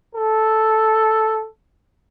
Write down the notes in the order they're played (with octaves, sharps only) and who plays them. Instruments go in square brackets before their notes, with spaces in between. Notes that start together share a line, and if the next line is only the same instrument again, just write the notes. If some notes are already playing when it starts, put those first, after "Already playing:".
[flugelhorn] A4